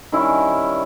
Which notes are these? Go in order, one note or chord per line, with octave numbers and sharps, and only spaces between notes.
D#3 G3 C#4 E4